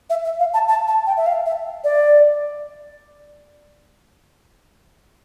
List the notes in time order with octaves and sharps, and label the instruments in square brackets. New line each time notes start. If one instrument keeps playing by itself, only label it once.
[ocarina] E5
E5
F5
A5
A5
A5
G5
E5
F5
E5
D5